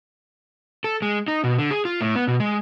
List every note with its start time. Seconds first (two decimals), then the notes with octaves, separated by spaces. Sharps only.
0.84 A4
1.02 G#3
1.28 D#4
1.44 B2
1.59 D3
1.71 G#4
1.85 F4
2.01 A2
2.15 B3
2.27 B2
2.40 G#3